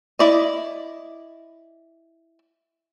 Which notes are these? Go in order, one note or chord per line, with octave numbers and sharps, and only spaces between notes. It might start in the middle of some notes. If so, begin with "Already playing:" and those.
E4 D5 D#5